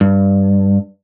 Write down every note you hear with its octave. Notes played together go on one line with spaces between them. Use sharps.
G2